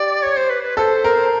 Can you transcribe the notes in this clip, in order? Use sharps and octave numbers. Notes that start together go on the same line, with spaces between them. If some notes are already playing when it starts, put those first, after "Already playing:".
Already playing: G4 D5
C#5
C5
B4
B4
A4 C5
A#4